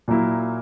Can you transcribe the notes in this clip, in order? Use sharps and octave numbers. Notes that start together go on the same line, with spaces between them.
A#2 F#3 A#3 E4